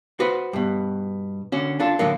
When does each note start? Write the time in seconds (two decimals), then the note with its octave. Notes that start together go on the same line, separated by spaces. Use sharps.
0.20 F#4 B4 C5
0.53 G2 B2
1.52 D3 C#4 F#4
1.80 D4 F4 A4
1.99 A2 D3 F#3 A#3